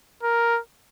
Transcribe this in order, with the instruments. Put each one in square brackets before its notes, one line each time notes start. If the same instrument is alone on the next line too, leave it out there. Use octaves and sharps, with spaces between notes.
[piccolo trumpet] A#4